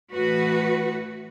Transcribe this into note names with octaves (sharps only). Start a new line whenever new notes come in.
A2 E3 F#4 B4